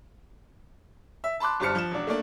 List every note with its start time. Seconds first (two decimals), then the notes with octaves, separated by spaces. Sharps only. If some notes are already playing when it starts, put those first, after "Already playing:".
1.24 E5
1.40 A5 B5 C6 D6 F#6
1.60 G1 G3 C5 A5 F6 C#7
1.75 F3 E7
1.91 E1 D4
2.07 A3 A#3 D4